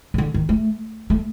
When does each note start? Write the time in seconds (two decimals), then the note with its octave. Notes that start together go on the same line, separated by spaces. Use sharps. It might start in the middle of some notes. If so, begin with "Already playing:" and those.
0.14 C#3
0.18 D3
0.34 D#3
0.49 A3
1.10 A3